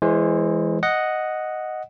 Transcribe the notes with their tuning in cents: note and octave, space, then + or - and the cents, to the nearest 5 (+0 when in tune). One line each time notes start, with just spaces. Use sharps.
E3 +5 G#3 +0 C5 +35
D#5 +0 F#5 +0